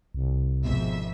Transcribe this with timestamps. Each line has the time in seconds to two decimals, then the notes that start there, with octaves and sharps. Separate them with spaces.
0.15 C2
0.65 G#1 F2 B2 E5